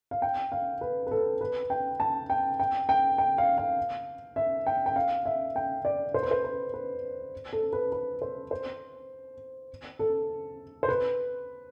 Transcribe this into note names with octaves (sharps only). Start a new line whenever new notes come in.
F5
G5
F5
B4
B4
A4
B4
G5
A5
G5
G5
G5
G5
F5
F5
E5
G5
G5
F5
E5
G5
D5
C5
B4
C5
B4
B4
A4
B4
B4
C5
C5
A4
C5
B4